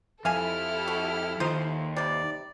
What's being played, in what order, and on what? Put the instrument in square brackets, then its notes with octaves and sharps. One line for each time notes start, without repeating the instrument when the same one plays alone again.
[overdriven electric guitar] F2 [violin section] E4 G4 A4 [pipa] E5 F5 G#5 [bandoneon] F6
[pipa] F#4
[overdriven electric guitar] D#2 D#3 [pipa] D#4 F4 C5
[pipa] C3 G3 [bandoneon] D5